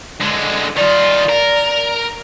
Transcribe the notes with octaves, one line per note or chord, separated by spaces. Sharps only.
D3 G#3
D#3 F4 D5
A#4